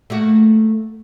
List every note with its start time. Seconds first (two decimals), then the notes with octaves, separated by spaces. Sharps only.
0.10 A3 A#3 F#4